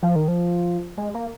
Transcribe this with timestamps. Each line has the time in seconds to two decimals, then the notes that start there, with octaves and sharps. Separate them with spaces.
0.03 F3
0.16 D#3
0.28 F3
0.97 G#3
1.14 A#3